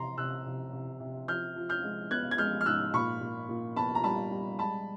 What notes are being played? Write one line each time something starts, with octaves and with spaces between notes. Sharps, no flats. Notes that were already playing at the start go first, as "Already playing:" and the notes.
Already playing: C3 E3 A#5 C6
C3 E6 F#6
C3
C3
C3
F3 F6 G6
F3
F6 G6
G#3
B3 F#6 G#6
G#6
G#3 F6 G6
F6
G#2 E6 F#6
A#2 B5 C#6
A#2
A#2
B3 A5 B5
A#5
G3 A5 B5
G3
G#3 A5 B5